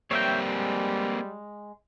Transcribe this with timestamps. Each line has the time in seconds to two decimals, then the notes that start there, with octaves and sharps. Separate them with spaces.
0.11 G3 A#3 C4 C#5 E5 G5
0.48 G#3